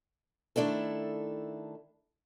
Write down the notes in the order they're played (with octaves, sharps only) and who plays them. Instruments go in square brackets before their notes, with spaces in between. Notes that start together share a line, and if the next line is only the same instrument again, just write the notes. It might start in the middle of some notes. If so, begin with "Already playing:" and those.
[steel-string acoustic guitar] D#3 A3 D4 E4 A4